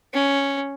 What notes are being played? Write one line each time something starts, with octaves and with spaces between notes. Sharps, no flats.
C#4